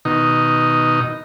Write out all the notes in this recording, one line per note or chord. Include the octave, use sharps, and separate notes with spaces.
B2 D#3 D#4